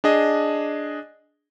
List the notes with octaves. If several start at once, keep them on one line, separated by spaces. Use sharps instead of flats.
D4 G#4 D#5